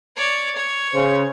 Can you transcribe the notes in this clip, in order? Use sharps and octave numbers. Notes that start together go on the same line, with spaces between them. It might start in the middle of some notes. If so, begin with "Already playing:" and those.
C#5 D5
C#5
C#3 C5